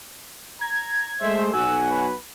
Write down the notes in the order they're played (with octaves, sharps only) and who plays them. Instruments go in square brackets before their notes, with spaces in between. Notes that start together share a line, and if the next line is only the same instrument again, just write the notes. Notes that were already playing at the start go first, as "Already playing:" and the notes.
[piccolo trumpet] A#5 [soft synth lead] G#6
[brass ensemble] G#3 A3 C5 [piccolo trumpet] E5
[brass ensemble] B1 F#4 [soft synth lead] G#5 [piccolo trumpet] E6
[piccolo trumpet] B4